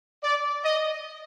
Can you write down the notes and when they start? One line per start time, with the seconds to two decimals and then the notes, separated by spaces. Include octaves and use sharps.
0.24 D5
0.64 D#5